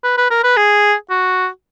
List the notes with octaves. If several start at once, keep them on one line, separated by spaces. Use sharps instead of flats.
B4
B4
A#4
B4
G#4
F#4